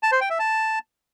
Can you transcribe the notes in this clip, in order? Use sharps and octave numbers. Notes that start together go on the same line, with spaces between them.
A5
C5
G5
E5
A5